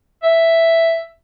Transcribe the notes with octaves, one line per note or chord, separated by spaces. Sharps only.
E5